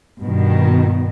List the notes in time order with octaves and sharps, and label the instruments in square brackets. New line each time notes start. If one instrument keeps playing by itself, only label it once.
[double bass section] G2 [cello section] B2 D#3